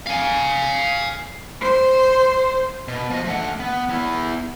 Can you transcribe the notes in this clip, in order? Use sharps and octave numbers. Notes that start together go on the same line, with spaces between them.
F5 G#5
C5
B2
F3 D#5
A3 F#5
B3
B3 E4